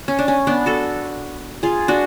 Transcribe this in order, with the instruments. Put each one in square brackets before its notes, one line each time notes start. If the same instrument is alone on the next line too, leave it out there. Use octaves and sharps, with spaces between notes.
[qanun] C#4
D4
C#4
B3 D4
F#4 A4
F4 G#4
D4 F#4